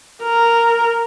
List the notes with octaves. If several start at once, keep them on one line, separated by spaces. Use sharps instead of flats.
A#4